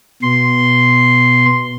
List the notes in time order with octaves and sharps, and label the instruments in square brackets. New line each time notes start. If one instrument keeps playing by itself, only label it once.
[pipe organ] B2 C6